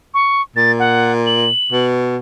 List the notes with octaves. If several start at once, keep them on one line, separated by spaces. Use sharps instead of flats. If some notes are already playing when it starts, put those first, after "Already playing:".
C#6
A#2 A6
F#5
F#7
B2